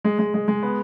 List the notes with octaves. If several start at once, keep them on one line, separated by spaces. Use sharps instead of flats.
G#3
G#3
G#3
G#3
B3